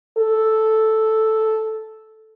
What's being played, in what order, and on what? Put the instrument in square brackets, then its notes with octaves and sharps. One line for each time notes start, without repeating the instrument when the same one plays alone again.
[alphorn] A4